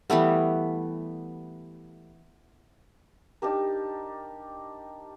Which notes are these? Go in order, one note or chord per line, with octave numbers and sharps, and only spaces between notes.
E3 G3 A3 B3
D4 D#4 G4 A#4